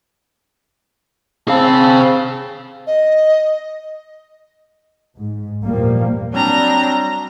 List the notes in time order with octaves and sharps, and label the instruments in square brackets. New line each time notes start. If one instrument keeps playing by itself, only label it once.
[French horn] C4 [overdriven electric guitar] G#4 F5 [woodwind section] A5 E6
[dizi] D#5
[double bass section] G#2
E2 A#2 F3 G3 A#3
[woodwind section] F#3 G3 C4 [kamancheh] D4 A#5